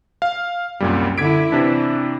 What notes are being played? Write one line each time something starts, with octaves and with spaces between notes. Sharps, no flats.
F5
C2 F#2 A#2 G3
D3 E4 G#6 B6 D7
C3 E3 D4